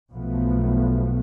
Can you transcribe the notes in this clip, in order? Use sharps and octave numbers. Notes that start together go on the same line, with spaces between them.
B1 B2 F3 A3 B3